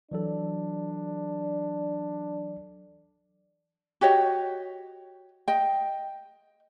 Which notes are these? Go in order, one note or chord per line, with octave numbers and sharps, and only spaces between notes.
E3 F#3 D4 A4
F#4 G4 C#5 D#5
D#5 G5